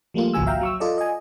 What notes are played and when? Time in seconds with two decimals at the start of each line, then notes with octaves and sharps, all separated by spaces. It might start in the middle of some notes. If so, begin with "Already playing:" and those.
0.14 F3 G3 A3 A#3 F4
0.34 G#1 C#2 F3 F#4 G#5 E6
0.47 E5 F5 G5 A#5
0.61 F#3 C#6 E6
0.80 F4 A4 D5 D#5
0.98 D#5 G#5